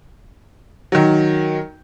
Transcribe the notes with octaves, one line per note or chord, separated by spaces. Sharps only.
D#3 F#3